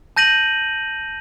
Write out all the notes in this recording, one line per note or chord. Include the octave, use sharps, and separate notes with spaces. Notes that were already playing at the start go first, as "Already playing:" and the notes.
A5 G6 A#6 D#7 F#7